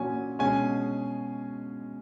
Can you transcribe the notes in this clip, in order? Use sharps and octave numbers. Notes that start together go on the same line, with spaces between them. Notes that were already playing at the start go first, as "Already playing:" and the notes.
Already playing: A#2 F#3 C#4 G#5
B2 G#3 C#4 G#5